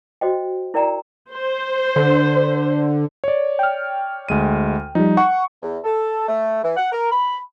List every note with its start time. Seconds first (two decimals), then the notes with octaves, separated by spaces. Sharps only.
0.21 F#4 C5 D#5 G5
0.74 E4 A#4 D5 G5 A#5
1.31 C5
1.96 D3
3.24 C#5 D5
3.59 G5 F6
4.29 D2 G#3 D#7
4.95 F3 G3 D#4
5.17 F#5 C#6
5.62 E2
5.84 A4
6.27 A3
6.62 E3
6.76 F#5
6.91 A#4
7.10 B5